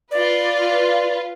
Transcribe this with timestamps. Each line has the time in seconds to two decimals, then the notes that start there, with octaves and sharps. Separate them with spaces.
0.11 F4 B4 D5